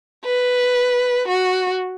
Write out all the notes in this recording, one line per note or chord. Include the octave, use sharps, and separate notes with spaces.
B4
F#4